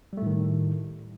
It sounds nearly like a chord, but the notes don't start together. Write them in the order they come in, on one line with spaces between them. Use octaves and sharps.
G3 A3 A2 D#3